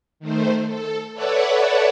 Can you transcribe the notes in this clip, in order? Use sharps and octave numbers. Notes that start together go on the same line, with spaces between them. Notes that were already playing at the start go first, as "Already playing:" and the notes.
D#3 A3 C5
A4
A4 B4 C#5 D5 E5 F#5